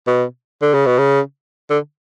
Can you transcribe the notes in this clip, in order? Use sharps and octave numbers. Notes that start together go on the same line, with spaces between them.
B2
D3
C#3
B2
C#3
D3